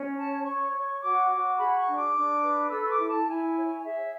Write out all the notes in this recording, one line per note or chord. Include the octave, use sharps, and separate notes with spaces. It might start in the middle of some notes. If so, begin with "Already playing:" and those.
Already playing: C#4
C#5 A5
C#5 C#6
C#5
F#4 D6
F#4
G#4 B5
C#6
D4
D6
D4
B4
A4 E6
C#6
D6
E4
A5
E4 G#5
C#5
G#4 E5